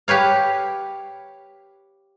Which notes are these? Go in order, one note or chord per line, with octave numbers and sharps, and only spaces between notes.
G4 B4 C#5 F5